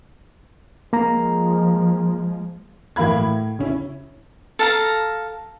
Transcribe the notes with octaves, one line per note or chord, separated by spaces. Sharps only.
F3 G#3 A#3 A#5
A2 E3 A#3 F5 B5 G#6
A2
C#3 C#4 E4
A4 F5 A#5